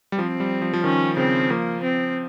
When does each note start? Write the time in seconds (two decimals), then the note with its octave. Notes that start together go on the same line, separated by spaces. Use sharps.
0.12 G3
0.19 F3 C4
0.40 G3
0.62 F3
0.73 F3
0.84 D#3 C#4
1.17 C#3 C4
1.50 F3 A#3
1.83 C4